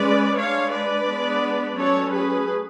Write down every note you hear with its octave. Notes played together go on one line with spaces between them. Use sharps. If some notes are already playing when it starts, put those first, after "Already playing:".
Already playing: G#3 C#4 B4 D5
G#3 D4 C#5 F5
B4 D5
G#3 B3 D4
F#3 A3 C#4 A4 C#5
G#4 B4